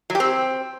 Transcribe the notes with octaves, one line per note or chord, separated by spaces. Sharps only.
F#3
G4
C4